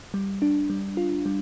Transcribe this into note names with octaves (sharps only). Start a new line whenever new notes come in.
G3
D4
G3
F4
G3